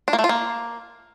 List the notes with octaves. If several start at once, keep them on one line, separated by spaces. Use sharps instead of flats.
D4
A#3
A3
F4
A#3